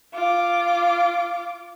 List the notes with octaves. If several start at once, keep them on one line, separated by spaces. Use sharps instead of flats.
F4 D6